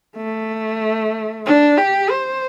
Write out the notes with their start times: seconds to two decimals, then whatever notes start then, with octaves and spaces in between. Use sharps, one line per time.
0.16 A3
1.46 D4
1.78 G4
2.10 C5